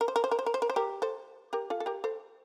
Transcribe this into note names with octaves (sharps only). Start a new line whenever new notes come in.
A#4
C5
A#4
C5
A#4
C5
A#4
C5
A#4
C5
G4 A#4
A4 C5
G4 A#4
F4 A4
A4
G4 A#4
A4 C5